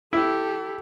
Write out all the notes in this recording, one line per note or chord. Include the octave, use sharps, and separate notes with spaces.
E4 G4 A4